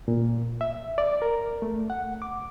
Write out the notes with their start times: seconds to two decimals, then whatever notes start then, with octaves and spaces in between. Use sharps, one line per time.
0.08 A#2
0.61 E5
0.98 D5
1.22 A#4
1.62 A3
1.90 F#5
2.22 D6